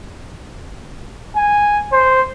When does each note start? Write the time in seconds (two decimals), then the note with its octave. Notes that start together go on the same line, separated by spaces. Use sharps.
1.36 G#5
1.92 C5